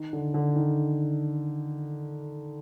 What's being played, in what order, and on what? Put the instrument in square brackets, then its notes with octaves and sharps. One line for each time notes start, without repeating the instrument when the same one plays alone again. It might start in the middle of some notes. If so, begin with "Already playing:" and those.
Already playing: [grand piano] D#3
D3
D3
D#3